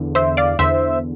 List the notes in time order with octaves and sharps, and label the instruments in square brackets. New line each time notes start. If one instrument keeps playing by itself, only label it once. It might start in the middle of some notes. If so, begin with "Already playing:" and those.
Already playing: [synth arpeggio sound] E2 D3
C5 E5
D5 F5
E2 D3 C5 E5